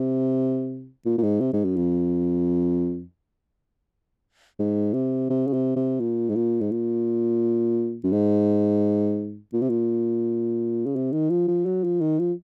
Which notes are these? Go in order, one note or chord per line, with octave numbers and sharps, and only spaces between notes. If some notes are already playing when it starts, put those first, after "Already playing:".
Already playing: C3
A#2
A#2
G#2
C3
G#2
F#2
F2
G#2
C3
C3
C#3
C3
C3
A#2
G#2
A#2
G#2
A#2
F#2
G#2
A#2
C3
A#2
C#3
C3
D#3
F3
F3
F#3
F3
D#3
F3